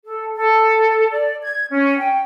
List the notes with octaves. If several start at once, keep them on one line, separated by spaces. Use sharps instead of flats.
A4
A4
D5
G#6
C#4
G5